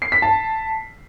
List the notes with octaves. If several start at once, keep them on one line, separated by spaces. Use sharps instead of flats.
C7
B6
A5